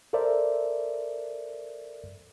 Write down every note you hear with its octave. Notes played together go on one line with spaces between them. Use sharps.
A4 A#4 C5 D5 E5